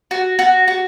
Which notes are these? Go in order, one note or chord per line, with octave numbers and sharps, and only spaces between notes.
F#4
F#4
F#4